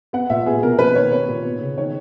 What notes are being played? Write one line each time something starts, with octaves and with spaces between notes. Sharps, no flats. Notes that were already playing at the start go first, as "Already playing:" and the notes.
B3 F#5
A#2 E5
B3 G#4
B2 A#4
A#3 B4
D#3 C#5
B3 C#5
A#2
B3
C#3
D#3 C#5